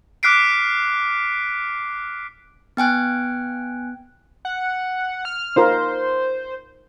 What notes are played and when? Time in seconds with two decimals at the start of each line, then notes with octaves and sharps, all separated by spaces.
0.23 D6 F6 F#6 B6 C7 D7
2.77 B3 G5 G#5 F#6
4.45 F#5
5.25 F6
5.56 D#4 F4 A#4 C5